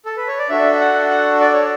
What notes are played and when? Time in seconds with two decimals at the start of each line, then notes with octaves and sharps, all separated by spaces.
0.05 A4
0.17 B4
0.28 C#5
0.39 D5
0.50 D4 F#4 A4 E5
0.73 E5
0.80 F#5
1.11 F#5
1.41 D5
1.53 C#5